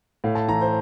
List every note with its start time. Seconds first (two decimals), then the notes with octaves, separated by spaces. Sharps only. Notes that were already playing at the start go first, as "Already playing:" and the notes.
0.24 A2 F5
0.35 A5
0.48 E3 A#5
0.61 C5